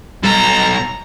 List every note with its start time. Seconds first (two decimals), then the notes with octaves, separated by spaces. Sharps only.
0.24 B1 G3 A4 A#5